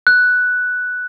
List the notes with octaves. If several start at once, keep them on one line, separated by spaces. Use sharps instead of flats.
F#6